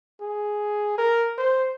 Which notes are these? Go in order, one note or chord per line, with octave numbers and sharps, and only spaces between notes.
G#4
A#4
C5